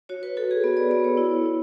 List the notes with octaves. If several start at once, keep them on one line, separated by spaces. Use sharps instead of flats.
F#4 C#5
B4
F#4 A4
G#4
B3 B4
D5
B3 D5
C#5
E4 C#5
E4